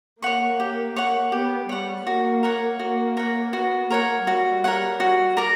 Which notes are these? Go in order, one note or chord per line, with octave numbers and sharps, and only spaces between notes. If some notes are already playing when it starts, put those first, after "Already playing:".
A#3 C#5 F#5 C#6
G4
C#5 F#5 C#6
B3 G4
G3 C#5 F#5 C#6
A#3 F#4
A#4 C#5 F#5
A#3 F#4
A#4 C#5 F#5
B3 F#4
A#3 A#4 C#5 F#5
G3 F#4
A#4 C#5 F#5
F#4
A#4 D5 A#5